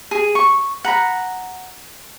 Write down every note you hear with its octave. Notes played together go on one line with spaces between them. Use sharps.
G#4
C#6
F#5 A#5 B5